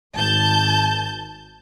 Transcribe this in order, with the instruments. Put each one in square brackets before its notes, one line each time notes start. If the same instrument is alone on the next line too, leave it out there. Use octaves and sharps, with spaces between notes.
[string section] G#1 A5 G6